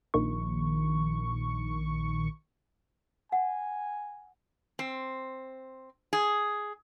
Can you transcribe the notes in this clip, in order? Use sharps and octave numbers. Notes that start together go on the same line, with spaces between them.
A#1 D#3 C#6
F#5 G#5
C4
G#4